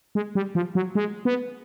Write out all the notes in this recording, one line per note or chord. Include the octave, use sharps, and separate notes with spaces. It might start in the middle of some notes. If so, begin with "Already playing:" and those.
G#3
G3
F3
F#3
G#3
B3